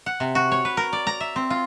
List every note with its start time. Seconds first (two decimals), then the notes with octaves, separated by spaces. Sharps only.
0.06 F#5
0.20 C3
0.35 F#4
0.52 C#5
0.65 B4
0.77 A#4
0.93 D5
1.07 A#5
1.20 E5
1.36 C4
1.50 F4